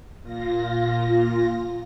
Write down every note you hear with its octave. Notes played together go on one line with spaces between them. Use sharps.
A#2 F4 A#6